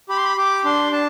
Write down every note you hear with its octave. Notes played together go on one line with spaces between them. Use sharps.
G4 B5
C6
B5
G4 D6
D4 C6
D4 A5